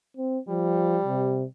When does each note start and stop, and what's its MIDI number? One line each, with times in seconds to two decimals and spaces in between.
0.17 0.39 60
0.49 0.99 53
0.49 1.45 55
1.05 1.45 48